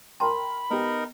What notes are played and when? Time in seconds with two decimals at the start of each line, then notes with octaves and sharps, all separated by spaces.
0.20 A#4 G5 A5 B5 C6
0.70 B3 D#4 G4 A#4